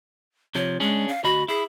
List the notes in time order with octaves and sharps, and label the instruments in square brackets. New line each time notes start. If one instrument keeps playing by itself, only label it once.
[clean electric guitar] C3 F3 [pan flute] C#5
[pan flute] G#3 [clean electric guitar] C#4 D4 G#4
[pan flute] F5
[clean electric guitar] D2 D#5 B5 [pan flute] F#4
[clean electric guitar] E4 [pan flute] G#4